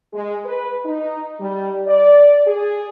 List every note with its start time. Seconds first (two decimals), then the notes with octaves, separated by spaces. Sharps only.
0.14 G#3
0.45 B4
0.85 D#4
1.40 G3
1.87 D5
2.46 G#4